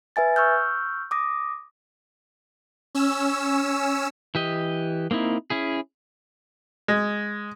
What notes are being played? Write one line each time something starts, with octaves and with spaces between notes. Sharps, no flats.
B4 E5 G#5 A6
C#6 E6 F6 G6
D6 D#6 A#6
C#4 E6
E3 G4 D#5
A#3 C4 D#4 E4
C#4 E4 G#4
G#3